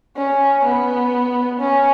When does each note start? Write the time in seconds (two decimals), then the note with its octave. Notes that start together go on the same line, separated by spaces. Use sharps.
0.17 C#4
0.64 B3
1.60 C#4